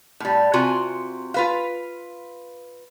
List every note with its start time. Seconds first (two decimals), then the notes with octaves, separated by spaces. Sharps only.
0.20 A2 G3
0.53 C3 F4 F#4 G#5
1.34 F4 B4 F5